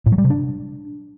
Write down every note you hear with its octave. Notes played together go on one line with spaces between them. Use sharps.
A2
F#3
G3
C3
D4